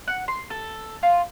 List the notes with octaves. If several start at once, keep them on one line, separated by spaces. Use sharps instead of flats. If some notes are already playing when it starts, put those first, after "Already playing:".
F#5
C6
A4
F4